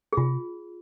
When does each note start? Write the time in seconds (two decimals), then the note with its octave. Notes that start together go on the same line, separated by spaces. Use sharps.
0.13 G#4
0.17 C3 F4